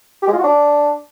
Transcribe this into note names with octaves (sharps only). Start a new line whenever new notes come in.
G4
G#3
F4
F#4
D4